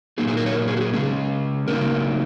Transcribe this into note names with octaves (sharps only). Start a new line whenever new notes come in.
A#2 F#3 A#3 D#4 G#4
G#4
A#4
C#5
A#4
G#4
F#4
G#4
C#3 G#3 C#4 G#4
C#3 F#3 A#3 D#4 A#4